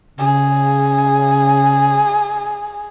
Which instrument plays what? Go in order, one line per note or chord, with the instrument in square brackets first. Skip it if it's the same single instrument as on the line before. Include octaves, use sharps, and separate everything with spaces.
[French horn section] C#3 [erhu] G#4